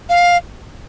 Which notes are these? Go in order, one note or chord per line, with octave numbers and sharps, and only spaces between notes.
F5